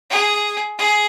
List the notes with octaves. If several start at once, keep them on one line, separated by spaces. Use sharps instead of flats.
G#4
G#4